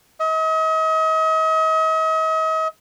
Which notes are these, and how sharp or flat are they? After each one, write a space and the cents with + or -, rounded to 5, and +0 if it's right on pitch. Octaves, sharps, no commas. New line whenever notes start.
D#5 +40